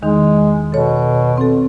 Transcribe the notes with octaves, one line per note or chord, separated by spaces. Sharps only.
E2 D#3 G#3 D#4
B2 A4 C#5
C4 A4